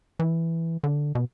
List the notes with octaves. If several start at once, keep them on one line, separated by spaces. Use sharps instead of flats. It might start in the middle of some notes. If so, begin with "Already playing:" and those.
E3
D3
B2